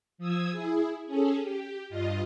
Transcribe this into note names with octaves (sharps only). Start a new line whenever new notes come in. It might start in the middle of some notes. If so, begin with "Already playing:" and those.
F3 D#6 E6 G#6
E4 G#4
C#4 G#4 A4
G4
G2 F4 D#5